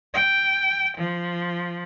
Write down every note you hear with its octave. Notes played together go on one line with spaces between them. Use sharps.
G5
F3